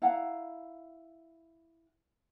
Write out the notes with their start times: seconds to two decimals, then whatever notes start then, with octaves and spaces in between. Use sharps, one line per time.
0.02 E4 F5 F#5 A#5